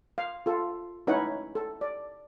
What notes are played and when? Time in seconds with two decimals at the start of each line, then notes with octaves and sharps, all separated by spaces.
0.18 F5
0.46 F4 A4
1.07 C#4 D#4 E4 B4 C#5 F#5
1.55 A4
1.81 D5